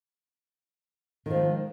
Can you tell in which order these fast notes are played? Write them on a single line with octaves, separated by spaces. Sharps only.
D#3 F3 G#3